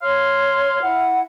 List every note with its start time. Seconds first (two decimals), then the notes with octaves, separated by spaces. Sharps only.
0.02 C#5 F5 C6
0.81 E4 F#5